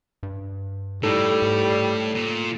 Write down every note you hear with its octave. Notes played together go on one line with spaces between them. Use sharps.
G2
A2 G3 D#4 A4
G#2
A#2